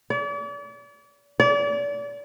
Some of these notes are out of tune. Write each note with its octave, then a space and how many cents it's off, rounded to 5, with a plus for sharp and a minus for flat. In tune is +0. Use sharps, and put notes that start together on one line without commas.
D5 -40
D5 -35